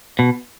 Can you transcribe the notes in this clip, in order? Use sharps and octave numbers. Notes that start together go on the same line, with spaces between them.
B2